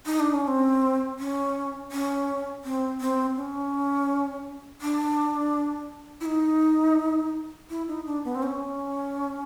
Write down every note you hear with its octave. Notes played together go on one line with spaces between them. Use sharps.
D#4
D4
C#4
C4
C#4
C#4
C4
C4
C#4
D4
E4
D#4
E4
D#4
D4
B3
C4
C#4